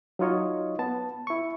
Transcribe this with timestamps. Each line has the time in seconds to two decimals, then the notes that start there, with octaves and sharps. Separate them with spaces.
0.19 F#3 D#4 F4 C#5 D#5
0.79 B3 A5
1.27 E4 C#6